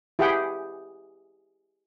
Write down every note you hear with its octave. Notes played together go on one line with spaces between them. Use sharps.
E4 G4 G#4 F#5 G5